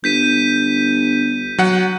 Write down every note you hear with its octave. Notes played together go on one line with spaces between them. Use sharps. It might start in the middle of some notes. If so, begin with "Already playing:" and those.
G1 G6 B6 D#7
F#3 F#5